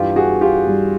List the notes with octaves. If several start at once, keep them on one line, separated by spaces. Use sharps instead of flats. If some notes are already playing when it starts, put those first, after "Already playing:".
Already playing: G2 E3 G3 F4 G4
F#4 G#4
F4 G4
G2 E3 G3